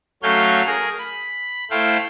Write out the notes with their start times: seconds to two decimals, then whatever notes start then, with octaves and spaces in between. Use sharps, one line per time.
0.23 F#3 A3 C#4 C#5 F5 G6
0.66 G#4 A#4
0.99 B5
1.71 A3 E4 C5 F5 G5